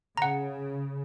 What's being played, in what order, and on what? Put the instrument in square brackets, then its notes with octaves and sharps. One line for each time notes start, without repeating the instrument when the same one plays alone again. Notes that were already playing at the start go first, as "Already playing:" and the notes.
[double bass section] C#3 [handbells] F#5 A#5